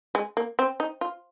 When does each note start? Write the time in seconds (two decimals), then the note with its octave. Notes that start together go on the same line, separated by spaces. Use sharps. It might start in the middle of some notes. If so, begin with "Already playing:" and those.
0.15 G#3
0.37 A#3
0.59 C4
0.80 D#4
1.01 F4